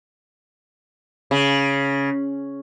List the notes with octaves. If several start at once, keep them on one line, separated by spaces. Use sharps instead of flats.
C#3